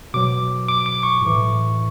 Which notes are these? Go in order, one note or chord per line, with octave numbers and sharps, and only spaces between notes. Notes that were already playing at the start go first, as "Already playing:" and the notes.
B2 F#3 D6
D6
D6
C#6
A2 E3